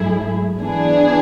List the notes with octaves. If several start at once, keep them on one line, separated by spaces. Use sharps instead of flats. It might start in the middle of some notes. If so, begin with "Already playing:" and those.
Already playing: G#2 F#3 A3 E4 G#4
E3 B3 D4 G#4